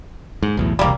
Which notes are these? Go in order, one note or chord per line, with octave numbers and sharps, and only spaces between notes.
G#2
B1 E2 A2
E1 C2 G3 A#3